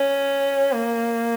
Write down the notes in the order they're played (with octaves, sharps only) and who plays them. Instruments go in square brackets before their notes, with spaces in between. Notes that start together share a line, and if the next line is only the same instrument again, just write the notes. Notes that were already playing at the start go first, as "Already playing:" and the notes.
Already playing: [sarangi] C#4
A#3